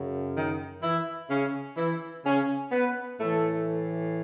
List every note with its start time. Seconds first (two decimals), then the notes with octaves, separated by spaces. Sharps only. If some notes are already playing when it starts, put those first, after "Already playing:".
Already playing: F#2 C#3
0.35 D#3 D#4
0.82 E3 E4
1.30 C#3 C#4
1.77 E3 E4
2.25 C#3 C#4
2.71 B3 B4
3.19 A2 E3 A3 A4